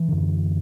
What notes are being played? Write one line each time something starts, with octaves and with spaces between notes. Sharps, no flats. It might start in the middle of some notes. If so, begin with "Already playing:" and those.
Already playing: E3
F#2 D3